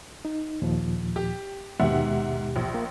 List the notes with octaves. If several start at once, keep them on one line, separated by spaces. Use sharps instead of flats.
D#4
D#2 A#2 F3
G4
D#2 G#2 B2 G4 E5 F#5
A#1
A#3